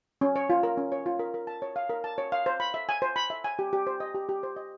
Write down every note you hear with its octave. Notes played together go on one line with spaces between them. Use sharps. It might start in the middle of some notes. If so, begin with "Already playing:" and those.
C#4
C#5
F4
A#4
C#4
C#5
F4
A#4
A#4
A5
C#5
F5
A#4
A5
C#5
F5
C5
B5
E5
G#5
C5
B5
E5
G#5
G4
G4
C5
D#5
G4
G4
C5
D#5